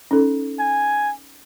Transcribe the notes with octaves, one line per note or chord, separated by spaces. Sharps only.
C#4 D#4 A4
G#5